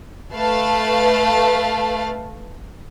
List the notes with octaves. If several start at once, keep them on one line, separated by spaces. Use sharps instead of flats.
A3 B4 F5 A5